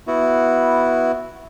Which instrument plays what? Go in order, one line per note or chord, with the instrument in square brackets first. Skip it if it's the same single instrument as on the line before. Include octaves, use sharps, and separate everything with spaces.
[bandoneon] B3 E4 F#4